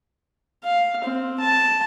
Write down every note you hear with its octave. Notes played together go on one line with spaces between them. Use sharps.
F5
C4
A5